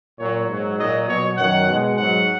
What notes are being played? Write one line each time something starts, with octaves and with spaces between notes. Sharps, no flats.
A#2 F#3 C#5
G#2 F#3
A#2 F#3 D#5
B2 F#3 C#5
F#2 D#3 F#3 F#5
B2 G#3
G#2 F#3 F#5